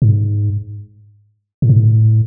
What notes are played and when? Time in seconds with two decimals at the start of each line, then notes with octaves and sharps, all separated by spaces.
0.02 G#2
1.62 A2
1.69 G#2
1.78 A2